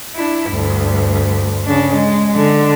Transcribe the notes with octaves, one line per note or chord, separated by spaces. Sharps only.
D4 E4
D2 G2
C#3 D4
G#3
D3